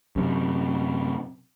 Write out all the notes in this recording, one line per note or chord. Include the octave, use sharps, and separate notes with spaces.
F#2 C3